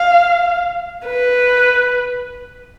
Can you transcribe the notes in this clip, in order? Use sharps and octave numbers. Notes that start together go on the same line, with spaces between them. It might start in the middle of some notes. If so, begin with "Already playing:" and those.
Already playing: F5
B4